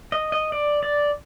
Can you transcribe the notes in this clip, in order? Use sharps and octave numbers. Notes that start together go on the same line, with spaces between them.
D#5
D#5
D5
D5